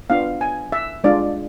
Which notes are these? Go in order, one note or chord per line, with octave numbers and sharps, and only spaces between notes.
B3 D4 F4 F5
G#5
E5
G#3 D4 F4 D5